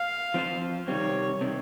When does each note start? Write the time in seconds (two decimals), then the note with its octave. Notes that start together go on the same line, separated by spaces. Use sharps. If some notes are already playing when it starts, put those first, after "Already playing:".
Already playing: F5
0.34 F3 C4 F4 C5
0.87 C3 D#3 G3 C4 C#5
1.41 C3 D#3 G3 C4